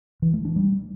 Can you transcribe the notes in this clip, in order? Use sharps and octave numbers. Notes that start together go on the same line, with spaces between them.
E3
A3
D4
G3